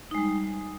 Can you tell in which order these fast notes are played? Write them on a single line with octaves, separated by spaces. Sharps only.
D#4 G#3 G3